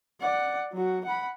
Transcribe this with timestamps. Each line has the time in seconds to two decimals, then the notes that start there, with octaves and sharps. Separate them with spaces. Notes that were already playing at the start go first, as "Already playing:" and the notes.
0.21 D5 F#5
0.72 F#3 F#4
1.05 F#5 B5